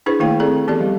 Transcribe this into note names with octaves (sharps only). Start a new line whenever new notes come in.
D4 E4 G#4 B4 C5
D#3 A3 A#3 E4 F5 G5
C4 G#4 A4 D5
E3 B3 G4 A4 D5
F3 G3